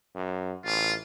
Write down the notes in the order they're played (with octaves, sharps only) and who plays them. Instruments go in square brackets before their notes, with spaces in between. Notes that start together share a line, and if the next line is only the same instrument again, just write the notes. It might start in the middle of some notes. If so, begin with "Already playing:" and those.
[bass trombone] F#2
[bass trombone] A1 [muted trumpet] F4